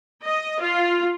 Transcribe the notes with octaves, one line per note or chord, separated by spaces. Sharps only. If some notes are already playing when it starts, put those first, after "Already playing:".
D#5
F4